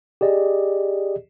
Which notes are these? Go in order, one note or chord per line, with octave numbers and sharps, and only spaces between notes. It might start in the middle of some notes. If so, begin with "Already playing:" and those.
G4 G#4 D5 D#5